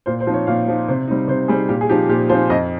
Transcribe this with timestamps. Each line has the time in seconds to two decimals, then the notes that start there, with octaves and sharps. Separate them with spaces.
0.06 A#2 C5
0.20 C5
0.27 F3 C4 D#4
0.34 C#5
0.47 A#2 F5
0.68 F3 C4 D#4
0.88 C3 C5
1.08 G3 C4 D#4
1.28 C3 C5
1.48 G3 C4 D#4 G#4
1.69 A#2 G4
1.81 G#4
1.89 F3 C4 D#4 G4
2.09 A#2 G4
2.30 F3 C4 D#4 C5
2.50 F2 D#5